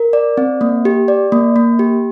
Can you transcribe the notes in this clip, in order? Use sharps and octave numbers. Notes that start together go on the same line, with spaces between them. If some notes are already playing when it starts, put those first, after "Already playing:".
Already playing: A#4
D5
C4
A#3
G4
D5
A#3
A#3
G4